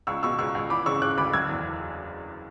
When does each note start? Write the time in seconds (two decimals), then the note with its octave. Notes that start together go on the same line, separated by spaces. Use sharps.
0.07 C#2 C#6 E6
0.23 B2 C#6 E6
0.39 C#2 C#6 E6
0.55 C#2
0.70 E3 B5 D6
0.86 C#3 C#6 E6
1.02 C#3 D6 F#6
1.17 D2 B5 D6
1.33 F#1 E6 G#6
1.49 E2